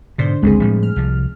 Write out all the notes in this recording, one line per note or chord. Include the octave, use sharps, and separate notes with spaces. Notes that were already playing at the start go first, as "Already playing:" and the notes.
G#2 B2 D3 D4 C5
G1 C#2 G2 G#3 C4 G#4
A2 F3 G3
F6
C2 F3